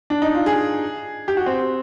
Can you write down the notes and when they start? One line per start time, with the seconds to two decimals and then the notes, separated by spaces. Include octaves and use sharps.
0.10 D4
0.22 D#4
0.35 F4
0.46 G#4
1.28 G4
1.37 F#4
1.46 C4